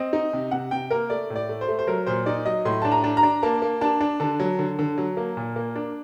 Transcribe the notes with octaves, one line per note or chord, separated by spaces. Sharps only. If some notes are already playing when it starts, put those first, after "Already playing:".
Already playing: C4 D#5
D#4
C3
C3 F#5
C3 G5
A#3 A#4
A3 D5
A2
D5
A3
C5
A3
C5
F#3 A#4
A#2 C5
D#4 D5
F#3 D#5
A2 C6
D4 A5
A#5
D4
A#5
D4
A#3 A5
A#3
D4 A5
D4
D3 A5
F#3
D3
D3
F#3
A#3
A#2
A#3
D4